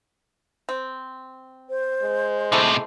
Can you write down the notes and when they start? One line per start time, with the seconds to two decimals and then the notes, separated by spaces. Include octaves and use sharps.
0.69 C4
1.70 C5
2.03 G#3
2.52 A2 C3 E4 A4 C5